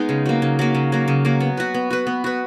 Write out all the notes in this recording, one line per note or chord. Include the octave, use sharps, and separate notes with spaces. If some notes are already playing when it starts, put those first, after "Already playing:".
Already playing: G#3 B3 D#4
C#3
F#3 A#3
C#3
F#3 A#3
C#3
F#3 A#3
C#3
F#3 A#3
B3
F#4 B4
B3
F#4 B4
B3
F#4 B4